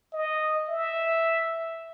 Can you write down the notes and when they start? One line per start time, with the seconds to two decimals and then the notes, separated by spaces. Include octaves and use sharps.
0.13 D#5
0.68 E5